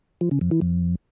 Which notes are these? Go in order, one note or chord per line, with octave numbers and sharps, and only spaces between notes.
F3
C#3
F2
E3
F2